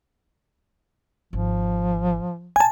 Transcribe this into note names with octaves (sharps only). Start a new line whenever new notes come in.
G#1 F3
A#2 G#5 A5